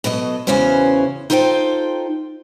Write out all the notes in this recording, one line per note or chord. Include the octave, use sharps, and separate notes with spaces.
B2 F#3 A4 D#5
E2 C#3 E3 C#4 F#4 C5
D#4 F4 A4 C5 E5 G5